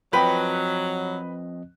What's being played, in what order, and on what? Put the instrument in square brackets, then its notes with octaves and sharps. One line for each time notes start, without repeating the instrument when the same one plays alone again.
[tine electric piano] F3 C4 D#5 [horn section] F#3 [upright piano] B4 G5 B5